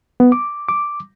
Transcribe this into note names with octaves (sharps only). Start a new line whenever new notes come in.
B3
D6
D6